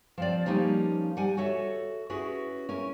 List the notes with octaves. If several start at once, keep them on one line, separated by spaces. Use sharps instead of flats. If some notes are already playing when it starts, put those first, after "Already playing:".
F3 C4 D5
F3 G3 A#3 C#4 D#4
G3 F#5 G#5
F#4 A4 C#5 E5
C#4 E4 F#4 G#4 B4
C#4 E4 A#4